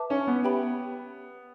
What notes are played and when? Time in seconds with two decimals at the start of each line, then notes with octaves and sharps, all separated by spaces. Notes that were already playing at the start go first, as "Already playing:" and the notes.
Already playing: B4 E5 A5 D6
0.10 C#4
0.27 B3
0.44 G4 B4 E5 G5 B5